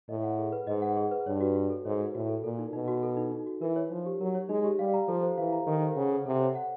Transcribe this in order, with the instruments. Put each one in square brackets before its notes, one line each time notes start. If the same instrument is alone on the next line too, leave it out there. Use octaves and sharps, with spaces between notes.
[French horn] A2 [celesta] D#5
[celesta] F#5
G#4
B4
[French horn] G#2 [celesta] D#5
[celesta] F#5
G#4
B4
[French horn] G2 [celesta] C#5
[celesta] F#4
F#4
A4
[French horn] G#2 [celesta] C#5
[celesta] F#4
[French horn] A2 [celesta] F#4
[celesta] A4
[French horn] A#2 [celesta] A4
[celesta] D#4
[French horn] B2 [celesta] D#4
[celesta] F#4
A4
D#4
D#4
F#4
[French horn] E3 [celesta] A#4
[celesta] C#5
[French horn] F3 [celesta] D#4
[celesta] G4
[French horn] F#3 [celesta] A#4
[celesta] C#5
[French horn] G#3 [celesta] D#4
[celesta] G4
[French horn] G3 [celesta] F5
[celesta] A#5
[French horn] F3 [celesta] A4
[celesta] C5
[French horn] E3 [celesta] F5
[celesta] A#5
[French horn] D#3 [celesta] A4
[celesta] C5
[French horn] C#3 [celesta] F#5
[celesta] A4
[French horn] C3 [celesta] A4
[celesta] C#5
F#5